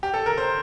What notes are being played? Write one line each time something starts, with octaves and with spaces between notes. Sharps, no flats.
G4
A4
A#4
C5